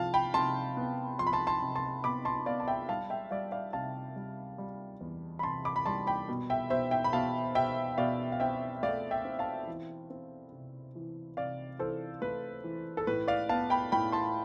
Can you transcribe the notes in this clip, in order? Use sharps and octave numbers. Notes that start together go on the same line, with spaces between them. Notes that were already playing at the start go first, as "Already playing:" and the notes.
Already playing: C3 F3 F5 A5
G5 B5
C3 A5 C6
B3
F3 C6
B5
A5 C6
A5 C6
C3
A5 C6
B3 B5 D6
A5 C6
B3 D5 F5
A5
E5 G5
G3 F5 A5
E5 G5
G3 D5 F5
D5 F5
C3 F5 A5
G3
G3
E2
B5
C3 A5 C6
B5 D6
B5
G3 A5 C6
G5 B5
B2
E5 G5
B2 C5 E5
E5 G5
B5
B2 F5 A5
B2 E5 G5
B2 D5 F5
F5
C4 E5 G5
A3 D5 F5
E5 G5
C4
F5 A5
E3
C4
C3
E3
C3 D5 F5
E3 A4 C5
A3 B4
E3
A4
A2 B4
D5 F5
B3 F5 A5
G5 B5
A2 G5 B5
A5 C6